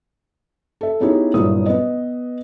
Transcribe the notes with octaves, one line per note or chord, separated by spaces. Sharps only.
A4 E5
B3 C#4 D#4 E4 G4 G#4
G1 A#2 F#3 E4 D#6
B3 B4 D#5